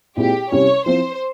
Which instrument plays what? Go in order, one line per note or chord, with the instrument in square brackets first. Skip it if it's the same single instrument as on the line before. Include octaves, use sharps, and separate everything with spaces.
[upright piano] A#2 G#3 C4 E4 [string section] G4
[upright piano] C3 G3 C#4 E4 [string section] C#5
[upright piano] F3 C4 E4 [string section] C5